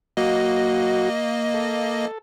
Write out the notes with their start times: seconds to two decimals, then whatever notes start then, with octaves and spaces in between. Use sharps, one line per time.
0.17 F#3 A#3 F#4 D#5
1.54 A4